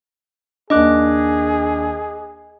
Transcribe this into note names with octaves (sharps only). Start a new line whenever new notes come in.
D#2 D4 G#4 D#5 D6 F#6